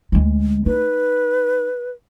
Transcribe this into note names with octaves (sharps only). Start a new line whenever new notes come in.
D2 G#3
D#4 B4